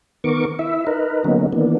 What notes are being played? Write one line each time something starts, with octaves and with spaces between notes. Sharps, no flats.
D#3 B3 A#4 C#6 D6
E4 E5
D#4 A#4 B4
D3 F#3 A#3 B3 C#4 D#4
D#3 E3 A#3 B3 D4